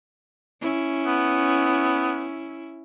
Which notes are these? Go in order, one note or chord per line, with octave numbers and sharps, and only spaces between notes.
C#4 E4
B3